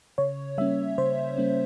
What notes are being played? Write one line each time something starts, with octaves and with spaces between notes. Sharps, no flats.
C#3 C#5
G3 A#3 C#4 E5
C#3 C5
G3 A#3 C#4